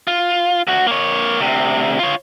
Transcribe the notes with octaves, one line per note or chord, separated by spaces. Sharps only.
F4
D2 F#4
A#3 C#5
D2 C3
F4 C#5